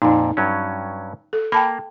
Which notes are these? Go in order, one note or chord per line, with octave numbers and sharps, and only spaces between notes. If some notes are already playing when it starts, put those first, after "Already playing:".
F2 A#2 D#4
G2 F#3 C#4
A4
A#3 G5 A5 B5